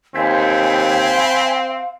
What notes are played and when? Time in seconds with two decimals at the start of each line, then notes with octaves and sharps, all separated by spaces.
0.15 D#2 C4 F5 G5 G#5 B5